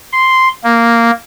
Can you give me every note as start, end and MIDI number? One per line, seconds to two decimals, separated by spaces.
0.13 0.48 84
0.64 1.10 58